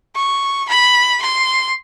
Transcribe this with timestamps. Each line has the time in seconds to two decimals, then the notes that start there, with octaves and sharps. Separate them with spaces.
0.16 C#6
0.69 B5
1.22 C6